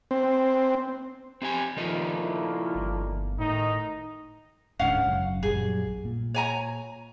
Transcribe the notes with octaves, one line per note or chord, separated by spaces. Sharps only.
C4
C4 G4 G#5
A#2 D#3 F3 A3 A#3 D#4 F4
E4
G1
A2 D#3 D#4
D1 G#2 D3 C#4 F5 F#5
F#1 F#2
A#1 F#2 G3 G#4
A#2
C#5 G#5 A#5